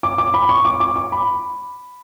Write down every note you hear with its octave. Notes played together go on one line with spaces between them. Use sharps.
D6
D6
B5
C#6
D6
D6
D6
B5